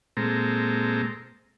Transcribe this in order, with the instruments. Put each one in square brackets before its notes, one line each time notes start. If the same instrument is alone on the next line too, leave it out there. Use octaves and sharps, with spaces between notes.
[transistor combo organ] A#2 G#3 C4 A4 A#5